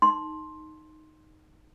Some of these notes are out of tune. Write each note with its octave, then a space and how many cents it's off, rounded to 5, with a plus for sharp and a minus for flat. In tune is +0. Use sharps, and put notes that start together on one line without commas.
D#4 +0 C6 +10